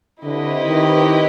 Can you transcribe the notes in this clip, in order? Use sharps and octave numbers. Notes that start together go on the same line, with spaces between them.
D3 C4 E4 G4 B4 D#5
D#3